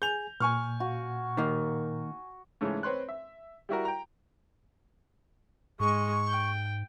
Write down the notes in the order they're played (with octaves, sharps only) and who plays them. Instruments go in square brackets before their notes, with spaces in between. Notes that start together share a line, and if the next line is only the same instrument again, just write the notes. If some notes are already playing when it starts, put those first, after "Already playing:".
[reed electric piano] G#4 G#5 [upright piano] G6 F7
[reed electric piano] A#2 [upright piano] G#5 C#6 F6
[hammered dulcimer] F#4
[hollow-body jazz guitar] D#3 A#3
[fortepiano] G#2 C#3 E3 A3 C#4
C4 B4 C#5 C6 F#6
E5
G3 E4 F#4 A#4
G5 A#5
[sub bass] G#2 [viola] G#3 [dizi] C#6
[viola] G5